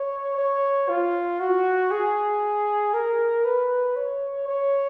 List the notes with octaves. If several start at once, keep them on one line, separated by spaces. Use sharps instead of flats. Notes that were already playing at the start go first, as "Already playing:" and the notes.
Already playing: C#5
C#5
F4
F#4
G#4
A#4
B4
C#5
C#5